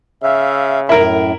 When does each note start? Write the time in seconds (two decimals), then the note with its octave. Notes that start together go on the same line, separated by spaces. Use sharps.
0.23 C#3 E5 F5
0.89 F#2 A2 E4 A#4